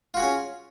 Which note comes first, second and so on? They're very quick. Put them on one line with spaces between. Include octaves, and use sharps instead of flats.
F4 F#4 G#4 C#4